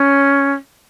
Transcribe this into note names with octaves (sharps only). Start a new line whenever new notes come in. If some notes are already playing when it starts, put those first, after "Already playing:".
Already playing: C#4